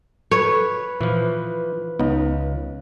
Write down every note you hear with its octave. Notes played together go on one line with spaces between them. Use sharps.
A4 B4 C#5
A#2 E3 F3
C#2 B3 D#4